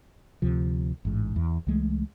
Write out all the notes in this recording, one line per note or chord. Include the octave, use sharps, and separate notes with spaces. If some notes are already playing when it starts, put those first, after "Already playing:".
D2 C3 F3
A1 G#2
E2
C#2 E3 G#3 A3